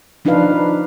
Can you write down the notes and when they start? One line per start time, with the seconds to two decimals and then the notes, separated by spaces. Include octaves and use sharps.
0.25 F3 D4 D#4 F4 B4 F5